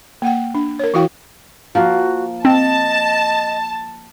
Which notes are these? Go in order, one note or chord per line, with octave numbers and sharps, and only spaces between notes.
A#3 F#5 G5
D4
A#4 C#5
E3 E4 F#4 F5 G5 C#6
F3 A#3 F#4 A#4
C4 D#5 A5